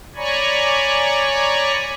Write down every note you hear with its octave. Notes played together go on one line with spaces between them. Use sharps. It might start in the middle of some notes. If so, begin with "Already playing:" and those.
C#5 D5 G#5 A#5 B5 C#6